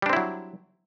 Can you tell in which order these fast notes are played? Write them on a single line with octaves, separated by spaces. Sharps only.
G3 D4 C4 E4 F#3